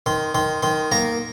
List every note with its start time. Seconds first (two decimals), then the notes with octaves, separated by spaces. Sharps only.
0.06 D#3 C6
0.35 D#3 C6
0.63 D#3 C6
0.92 A#3 A#5